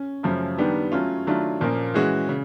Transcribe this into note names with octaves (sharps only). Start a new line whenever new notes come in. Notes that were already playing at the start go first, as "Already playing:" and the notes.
Already playing: C#4
F#2 C#3 F3 A3 C#4
D#3 G3 B3 D4 G4
F#3 A3 C#4 F4
D#3 F#3 A3 D4 F4
A#2 F3 A#3 C#4
E3 G#3 C#4 F#4
C#3